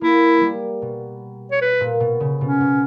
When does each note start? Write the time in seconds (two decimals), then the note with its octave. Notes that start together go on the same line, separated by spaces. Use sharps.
0.01 A#3 E4
0.38 G3 A#3
0.82 B2
1.51 C#5
1.61 B4
1.80 A#2
2.00 B2
2.20 C#3
2.41 B2 C#4
2.61 B2